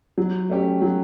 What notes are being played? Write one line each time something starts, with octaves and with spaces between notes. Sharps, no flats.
F#3
A3 C#4 G4
F#3